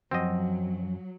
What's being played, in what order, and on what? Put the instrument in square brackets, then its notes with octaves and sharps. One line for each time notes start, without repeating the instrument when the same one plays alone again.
[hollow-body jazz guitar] F#2 F3 F#5 [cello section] F#3 [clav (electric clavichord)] C4 D#5